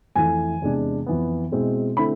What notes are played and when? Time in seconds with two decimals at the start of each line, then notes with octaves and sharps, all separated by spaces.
0.16 F2 E3 A3 E4 G#5
0.62 E2 C3 G#3 D4
1.06 F2 E3 B3
1.51 B2 G#3 C4 E4
1.97 D3 A3 C4 E4 B5